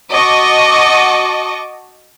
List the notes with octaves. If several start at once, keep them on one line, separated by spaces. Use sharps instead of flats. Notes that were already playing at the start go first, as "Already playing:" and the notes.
F#4 D#5 A5 C#6 D6